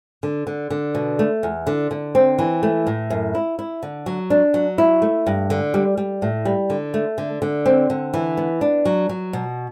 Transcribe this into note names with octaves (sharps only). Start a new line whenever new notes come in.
D3
D3
D3
B2
A3
E2
D3
D3
C4
E3
A3
A2
F#2
E4
E4
D3
F#3
D4
F#3
E4
A3
G2
D3
G3
G3
A2
G3
D3
A3
D3
D3
C4
D3
E3
B3
D4
F#3
F#3
B2